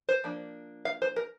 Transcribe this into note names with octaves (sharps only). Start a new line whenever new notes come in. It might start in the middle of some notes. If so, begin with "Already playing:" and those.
C5
F3 A#3 D4
F5
C5
A#4